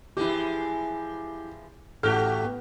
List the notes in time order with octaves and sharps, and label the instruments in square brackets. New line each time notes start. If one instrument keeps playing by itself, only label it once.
[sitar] E3 F3 G#3 [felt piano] E4 G4
[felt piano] A1 A4 F6 [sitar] A3 F#4 G4
[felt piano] B3